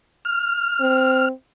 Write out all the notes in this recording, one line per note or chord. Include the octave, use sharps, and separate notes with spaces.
F6
C4